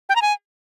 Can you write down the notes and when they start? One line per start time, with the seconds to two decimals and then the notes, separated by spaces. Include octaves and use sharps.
0.09 G5
0.16 A#5
0.22 G#5